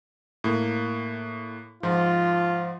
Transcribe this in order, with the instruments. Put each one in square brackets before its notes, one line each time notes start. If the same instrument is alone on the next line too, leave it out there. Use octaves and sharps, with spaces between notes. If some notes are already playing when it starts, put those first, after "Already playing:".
[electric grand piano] A2 A#3
[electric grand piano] G#2 F3 [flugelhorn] F4